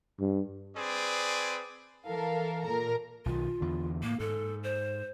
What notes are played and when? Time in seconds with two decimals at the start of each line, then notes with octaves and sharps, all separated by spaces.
0.20 G2
0.76 C4 G#4 B4 D5
2.07 E3 A4 A#4 F5
2.63 A#2 A#4 A#5
3.26 B1 D#3 F4
3.60 E2 D3
4.03 A2 A#3
4.20 G#2 A4
4.64 C5